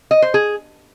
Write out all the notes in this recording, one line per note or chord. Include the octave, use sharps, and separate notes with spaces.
D#5
C5
G#4